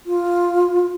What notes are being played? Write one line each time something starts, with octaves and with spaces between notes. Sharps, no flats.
F4